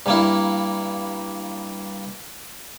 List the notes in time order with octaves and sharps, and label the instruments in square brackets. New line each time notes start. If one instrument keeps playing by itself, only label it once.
[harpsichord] G2 A#3 E4